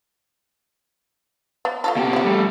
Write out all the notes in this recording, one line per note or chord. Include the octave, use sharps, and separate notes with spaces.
B3
A3 F4 A4
B2 G4
F#3 E4
G3 A3